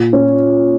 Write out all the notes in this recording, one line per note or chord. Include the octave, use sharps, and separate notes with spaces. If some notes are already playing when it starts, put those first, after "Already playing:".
Already playing: A#2
C#4